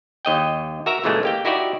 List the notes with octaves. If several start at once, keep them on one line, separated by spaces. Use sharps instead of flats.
D#2 D#5 G5
F#4 A#4 E5 A#5
A#2 C#3 E3 G#3 A3
A#3 G4 G5
D#4 E4 F#4 G4 D5